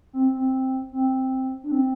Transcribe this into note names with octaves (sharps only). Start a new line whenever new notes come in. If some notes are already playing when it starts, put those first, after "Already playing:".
C4
C4
C4
D4
C4